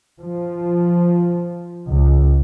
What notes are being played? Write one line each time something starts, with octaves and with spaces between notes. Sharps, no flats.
F3
C#2